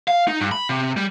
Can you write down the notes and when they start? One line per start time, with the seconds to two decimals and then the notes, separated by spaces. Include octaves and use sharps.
0.08 F5
0.28 D#4
0.40 G2
0.52 B5
0.69 C3
0.97 G3